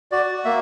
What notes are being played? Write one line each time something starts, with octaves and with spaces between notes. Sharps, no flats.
F#4 D5
A#3 E5